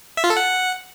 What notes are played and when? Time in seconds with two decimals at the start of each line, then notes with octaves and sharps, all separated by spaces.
0.17 E5
0.24 F4
0.30 A4
0.37 F#5